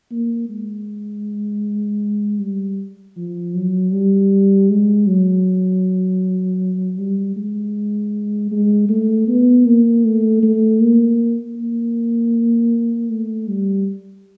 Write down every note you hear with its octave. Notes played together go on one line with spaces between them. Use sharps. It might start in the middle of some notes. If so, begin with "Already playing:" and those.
A#3
G#3
G3
F3
F#3
G3
G#3
F#3
G3
G#3
G#3
A3
B3
A#3
A3
A3
A#3
A#3
A3
G3